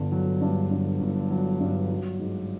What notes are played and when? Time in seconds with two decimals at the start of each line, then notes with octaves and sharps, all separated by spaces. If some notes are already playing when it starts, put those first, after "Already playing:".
Already playing: G1 D3
0.12 F#3
0.41 G2
0.71 D3
1.00 G1
1.30 F#3
1.61 G2
1.90 F#3
2.19 G#2